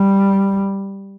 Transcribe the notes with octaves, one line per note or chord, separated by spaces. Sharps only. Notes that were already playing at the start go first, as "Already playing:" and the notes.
Already playing: G3